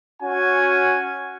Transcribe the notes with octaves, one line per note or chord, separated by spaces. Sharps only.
C#4 F#4 G#5